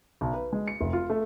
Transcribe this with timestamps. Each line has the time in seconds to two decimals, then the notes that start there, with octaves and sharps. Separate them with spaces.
0.21 B1
0.34 B4
0.53 G#3
0.68 C#7
0.81 F1
0.93 F4
1.10 A3